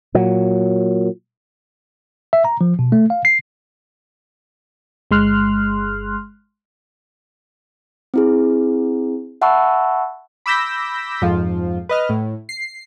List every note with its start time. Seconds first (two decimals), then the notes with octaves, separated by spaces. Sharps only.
0.15 A#2 F#3
2.33 E5
2.45 A#5
2.61 F3
2.79 B2
2.92 A3
3.10 F5
3.25 C7
5.11 G1 G#3 C6 F6 F#6
8.14 C4 E4 G#4
9.42 E5 F#5 A5 B5 C#6 E6
10.46 B5 D6 E6 G6 A#6 B6
11.22 F2 G#2 F3 F4
11.89 B4 D#5 F6
12.09 A2
12.49 C7